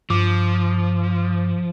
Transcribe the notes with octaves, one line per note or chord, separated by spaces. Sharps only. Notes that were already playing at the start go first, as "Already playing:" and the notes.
G2 F3 D6